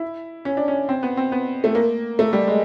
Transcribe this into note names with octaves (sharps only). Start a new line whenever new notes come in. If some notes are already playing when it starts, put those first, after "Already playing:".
Already playing: E4
C#4
D4
C#4
C4
B3
C4
B3
A3
A#3
A3
G3
G#3